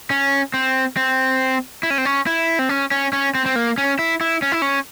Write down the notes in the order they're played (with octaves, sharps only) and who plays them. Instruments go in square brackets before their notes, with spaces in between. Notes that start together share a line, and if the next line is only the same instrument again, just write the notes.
[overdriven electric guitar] C#4
C4
C4
E4
C#4
C4
C#4
E4
C4
C#4
C#4
C#4
C4
C4
A#3
C#4
E4
E4
C#4
E4
C#4